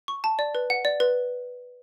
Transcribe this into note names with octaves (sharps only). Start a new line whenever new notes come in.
C#6
A5
D5
B4
F#5
D5
B4